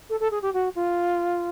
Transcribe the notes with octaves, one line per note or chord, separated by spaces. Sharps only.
A4
A4
G#4
G4
F#4
F4